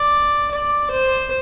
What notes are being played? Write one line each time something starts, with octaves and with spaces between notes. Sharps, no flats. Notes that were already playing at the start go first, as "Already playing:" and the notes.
Already playing: D5
D5
C5